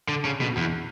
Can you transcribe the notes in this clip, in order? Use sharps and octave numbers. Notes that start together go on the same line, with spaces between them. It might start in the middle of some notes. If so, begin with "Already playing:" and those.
D3
C#3
B2
E2